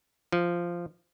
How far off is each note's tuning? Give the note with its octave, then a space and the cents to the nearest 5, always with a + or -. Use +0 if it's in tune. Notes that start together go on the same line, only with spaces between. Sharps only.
F3 -10